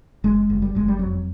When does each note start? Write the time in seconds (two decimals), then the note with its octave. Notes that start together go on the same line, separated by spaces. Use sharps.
0.24 F#1 G#3
0.50 F#1
0.62 G3
0.75 F#1 G#3
0.88 G3
0.99 F2 F#3